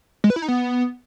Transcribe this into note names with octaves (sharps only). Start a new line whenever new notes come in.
G#3
B4
E4
D#4
B3